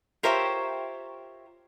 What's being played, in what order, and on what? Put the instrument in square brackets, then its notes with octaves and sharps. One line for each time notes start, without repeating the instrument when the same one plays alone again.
[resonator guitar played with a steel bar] F4 G4 A#4 C5 C#5 E5